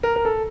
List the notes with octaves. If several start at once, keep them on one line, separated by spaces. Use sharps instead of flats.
A#4
A#4
A4